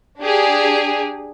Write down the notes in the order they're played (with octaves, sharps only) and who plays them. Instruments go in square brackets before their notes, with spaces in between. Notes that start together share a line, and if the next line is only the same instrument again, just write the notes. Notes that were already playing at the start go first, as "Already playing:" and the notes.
[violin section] D4 G4 G#4